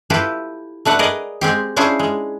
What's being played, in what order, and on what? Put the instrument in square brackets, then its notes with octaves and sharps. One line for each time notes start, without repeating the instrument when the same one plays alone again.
[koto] E4 F4 G4 A4 B4
A3 D4 B4 F#5
G#4 A#4 B4 D5 D#5
G#3 C4 G4
C#4 D4 E4 F4 G#4 C5
G#3